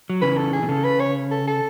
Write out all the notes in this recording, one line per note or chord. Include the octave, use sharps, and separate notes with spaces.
F#3
C#3 E3 B4
A4
G#4
B2
C#3 A4
B4
C#5
A4
A4